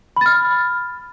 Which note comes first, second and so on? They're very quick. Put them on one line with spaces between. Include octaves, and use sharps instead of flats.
B5 A6 F6